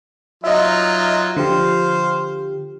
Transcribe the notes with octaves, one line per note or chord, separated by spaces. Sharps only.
F#3 D#4 F4 D#5 E5
D3 F3 G4 C5 F5